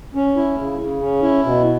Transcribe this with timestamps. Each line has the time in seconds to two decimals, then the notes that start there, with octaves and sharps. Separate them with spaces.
0.15 C#4
0.36 E4
0.58 C#3
0.79 C#3
1.01 C#4
1.23 E4
1.44 B2